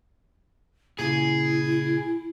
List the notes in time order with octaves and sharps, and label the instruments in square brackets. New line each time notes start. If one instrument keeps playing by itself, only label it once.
[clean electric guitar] A#2 C#3 [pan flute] E4 [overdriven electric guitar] G#4